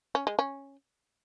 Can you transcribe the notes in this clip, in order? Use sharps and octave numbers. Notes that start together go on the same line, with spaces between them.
C#4
G#3
C#4